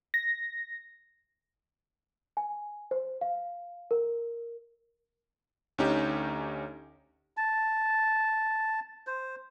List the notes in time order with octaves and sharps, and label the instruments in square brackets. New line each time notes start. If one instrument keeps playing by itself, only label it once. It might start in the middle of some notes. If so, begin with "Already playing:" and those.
[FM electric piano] A#6
[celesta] G#5
C5
F5
A#4
[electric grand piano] D2 C#4 D#4 G4
[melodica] A5
C5